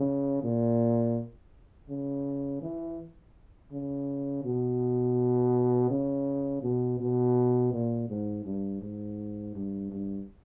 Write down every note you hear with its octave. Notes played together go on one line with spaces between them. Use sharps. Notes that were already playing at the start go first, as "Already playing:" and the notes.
Already playing: C#3
A#2
C#3
E3
C#3
B2
C#3
B2
B2
A#2
G#2
G2
G#2
G2
G2